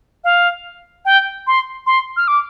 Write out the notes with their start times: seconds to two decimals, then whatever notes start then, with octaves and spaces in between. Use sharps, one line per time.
0.24 F5
1.05 G5
1.47 C6
1.87 C6
2.17 F6
2.28 D6